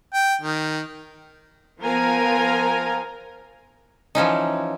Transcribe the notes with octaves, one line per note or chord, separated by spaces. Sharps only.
G5
D#3
F3 B3 A#4 F5 G#5 A#5
E3 F3 C#4 D#4